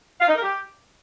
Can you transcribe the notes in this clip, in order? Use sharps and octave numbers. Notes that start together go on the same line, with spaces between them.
F5
D#4
A#4
G4